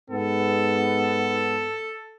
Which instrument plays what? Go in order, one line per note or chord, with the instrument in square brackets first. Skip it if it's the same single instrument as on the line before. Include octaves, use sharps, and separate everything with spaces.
[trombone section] G#2 B3 [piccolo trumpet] A4